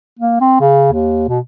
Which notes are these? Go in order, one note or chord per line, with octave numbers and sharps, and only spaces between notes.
A#3
C4
C#3
D#2
B2